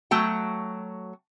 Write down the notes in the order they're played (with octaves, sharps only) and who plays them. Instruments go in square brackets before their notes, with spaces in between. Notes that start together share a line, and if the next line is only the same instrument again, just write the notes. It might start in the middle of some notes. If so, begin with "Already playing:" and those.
[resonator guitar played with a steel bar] F#3 A3 F#4 G5